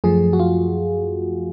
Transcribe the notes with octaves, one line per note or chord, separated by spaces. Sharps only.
F#2 F3 A3 G#4
F#4
F4